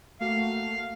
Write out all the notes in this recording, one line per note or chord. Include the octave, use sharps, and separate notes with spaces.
A3 A#3 F#4 F5